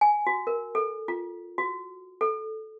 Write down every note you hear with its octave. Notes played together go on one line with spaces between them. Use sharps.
G#5
F#4
A#4
A4
F4
F#4
A4